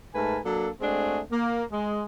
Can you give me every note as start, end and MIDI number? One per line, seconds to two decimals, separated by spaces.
0.14 0.38 44
0.14 0.38 57
0.14 0.38 70
0.14 0.38 71
0.14 0.38 80
0.14 0.38 81
0.45 0.68 54
0.45 0.68 58
0.45 0.68 62
0.45 0.68 69
0.81 1.19 56
0.81 1.19 57
0.81 1.19 60
0.81 1.19 62
0.81 1.19 66
0.81 1.19 68
1.31 1.64 58
1.71 2.03 56